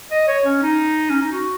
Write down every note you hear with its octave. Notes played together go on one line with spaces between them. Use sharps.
D#5
C#5
C#4
D#4
C#4
D#4
F#4